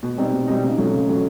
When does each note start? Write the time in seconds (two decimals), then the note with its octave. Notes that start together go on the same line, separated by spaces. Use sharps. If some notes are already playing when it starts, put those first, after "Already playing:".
0.03 B2
0.18 G3 C4 D#4
0.33 B2
0.47 G3 C4 D#4
0.63 C#3
0.78 F#3 A3
0.92 C#3
1.08 F#3 A3